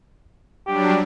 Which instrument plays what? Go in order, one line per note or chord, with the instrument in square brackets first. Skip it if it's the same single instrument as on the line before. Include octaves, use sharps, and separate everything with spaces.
[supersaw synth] F#3 G3 D4 [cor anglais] G4